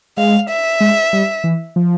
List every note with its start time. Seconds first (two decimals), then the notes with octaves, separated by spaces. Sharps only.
0.17 G#3 F5
0.49 E5
0.81 G#3
1.13 G3
1.44 E3
1.76 F3